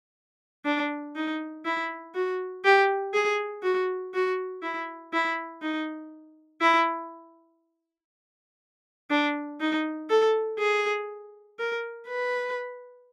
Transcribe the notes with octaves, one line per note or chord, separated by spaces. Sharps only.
D4
D#4
E4
F#4
G4
G#4
F#4
F#4
E4
E4
D#4
E4
D4
D#4
A4
G#4
A#4
B4